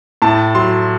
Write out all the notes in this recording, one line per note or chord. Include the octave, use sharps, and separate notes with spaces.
A2 A5
F#3 C6